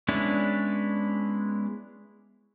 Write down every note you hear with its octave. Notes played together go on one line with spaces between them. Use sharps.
G#3 B3 C#4 D4 E4